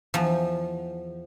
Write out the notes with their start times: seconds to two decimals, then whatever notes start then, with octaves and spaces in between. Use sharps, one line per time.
0.14 E2 F3